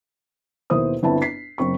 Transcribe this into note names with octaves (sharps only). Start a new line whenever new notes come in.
D#2 B2 E4 C5 D#6
G1 C4 E4 B4 A5
B6 C7
F#1 C4 C#6